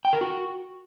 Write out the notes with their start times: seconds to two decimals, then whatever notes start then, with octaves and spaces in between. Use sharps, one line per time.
0.05 G5
0.13 A#4
0.21 F#4